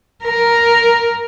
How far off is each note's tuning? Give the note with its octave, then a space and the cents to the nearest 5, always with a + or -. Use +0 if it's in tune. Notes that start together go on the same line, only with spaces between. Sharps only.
A#4 +5